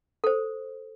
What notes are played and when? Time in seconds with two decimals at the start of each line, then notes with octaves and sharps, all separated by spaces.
0.24 A4 C5